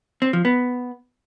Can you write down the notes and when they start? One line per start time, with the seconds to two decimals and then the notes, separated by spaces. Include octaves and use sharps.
0.22 C4
0.33 F3
0.45 B3